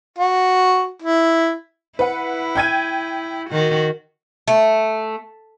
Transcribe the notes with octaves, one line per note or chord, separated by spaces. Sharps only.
F#4
E4
E4 B4 F#5
G5 G#6 D#7
D#3 F#4
A3